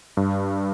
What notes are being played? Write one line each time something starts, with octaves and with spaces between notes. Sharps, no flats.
G2